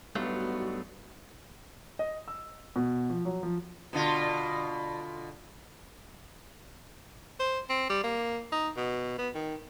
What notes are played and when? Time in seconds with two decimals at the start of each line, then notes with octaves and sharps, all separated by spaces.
0.15 G2 F#3 G3 A3 B3 D#4 F4 F#4
1.99 D#5
2.28 E6
2.76 B2
3.10 F3
3.25 F#3
3.43 F3
3.93 B2 D3 F4
7.39 C5
7.69 C4
7.89 G3
8.03 A#3
8.52 D#4
8.76 B2
9.18 B3
9.34 D#3